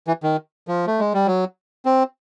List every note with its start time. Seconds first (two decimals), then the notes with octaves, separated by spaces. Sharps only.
0.07 E3
0.23 D#3
0.68 F3
0.87 A3
1.00 G#3
1.14 G3
1.27 F#3
1.85 C4